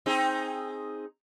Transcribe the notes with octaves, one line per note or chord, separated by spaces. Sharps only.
C4 D#4 G#4